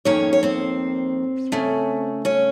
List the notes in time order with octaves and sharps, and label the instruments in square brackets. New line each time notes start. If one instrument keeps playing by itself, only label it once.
[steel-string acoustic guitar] F2 D#3 A#3 C#4 C#5
C#5
C4 C5
C#3 A3 C#4
C#4 C#5